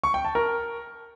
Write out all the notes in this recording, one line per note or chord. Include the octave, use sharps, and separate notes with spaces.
C#6
G5
A5
A#4